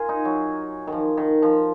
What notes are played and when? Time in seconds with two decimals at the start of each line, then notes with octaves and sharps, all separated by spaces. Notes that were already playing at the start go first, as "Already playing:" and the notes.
Already playing: F4 G#4 A#4
0.09 D#4
0.25 F#3
0.87 D#3
0.92 F3
1.17 D#3
1.42 F3